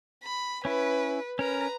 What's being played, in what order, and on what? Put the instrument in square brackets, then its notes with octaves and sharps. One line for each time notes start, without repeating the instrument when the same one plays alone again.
[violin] B5
[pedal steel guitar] C#4 E4 [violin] B4
[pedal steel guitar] C#4 A#4 [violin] B4 A#5